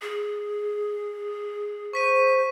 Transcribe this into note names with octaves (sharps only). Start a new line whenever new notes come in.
G#4
C5 C#6 B6 D#7